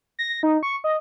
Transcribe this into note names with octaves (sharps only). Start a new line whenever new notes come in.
A#6
D#4
C#6
D#5